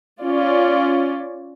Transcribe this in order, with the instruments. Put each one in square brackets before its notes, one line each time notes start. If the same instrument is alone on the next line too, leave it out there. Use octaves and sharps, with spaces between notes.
[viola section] C#4 F4 D5